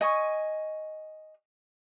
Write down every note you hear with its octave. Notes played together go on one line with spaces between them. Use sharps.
D#5 G#5 C#6